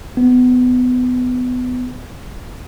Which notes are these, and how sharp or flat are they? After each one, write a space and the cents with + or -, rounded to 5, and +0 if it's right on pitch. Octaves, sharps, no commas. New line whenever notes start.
B3 +20